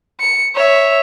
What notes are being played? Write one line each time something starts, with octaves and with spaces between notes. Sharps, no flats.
C#7
C#5 E5